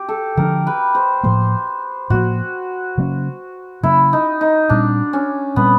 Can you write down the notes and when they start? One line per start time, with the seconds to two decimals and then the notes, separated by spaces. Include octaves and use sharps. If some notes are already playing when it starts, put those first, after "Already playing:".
Already playing: G4
0.09 A4
0.37 D3 F3 A3 D4 A#4
0.67 B4
0.95 C5
1.23 A2 F3 A#3 C5
2.10 A2 F3 A#3 F#4
2.98 C#3 F#3 A#3 C#4
3.83 C#3 F#3 A#3 C#4 E4
4.13 D#4
4.41 D#4
4.69 A#2 G3 C4 D4
5.13 C#4
5.56 A#2 G3 B3 C4